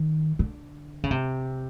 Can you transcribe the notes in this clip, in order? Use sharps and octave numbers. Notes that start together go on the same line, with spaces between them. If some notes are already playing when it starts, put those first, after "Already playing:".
Already playing: D#3
D3
C#3
C3